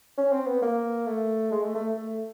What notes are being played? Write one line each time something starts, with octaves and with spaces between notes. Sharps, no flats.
C#4
C4
B3
A#3
A3
G#3
A3
A3
A3